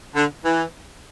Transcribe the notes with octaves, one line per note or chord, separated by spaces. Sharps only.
D3
E3